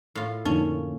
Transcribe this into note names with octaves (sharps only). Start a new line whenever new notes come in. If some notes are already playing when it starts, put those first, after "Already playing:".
A2 F4
F2 D3 A#3 C#4 D#4